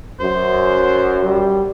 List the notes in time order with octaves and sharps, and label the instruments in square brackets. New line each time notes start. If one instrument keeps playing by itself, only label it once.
[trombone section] F#2 [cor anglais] C5
[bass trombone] G3